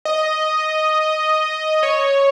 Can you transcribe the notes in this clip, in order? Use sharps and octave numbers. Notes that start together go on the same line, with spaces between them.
D#5
C#5